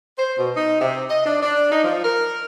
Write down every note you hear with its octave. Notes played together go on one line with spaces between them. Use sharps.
C5
B2
D#4
C3
D#5
D4
D4
D#4
F3
A#4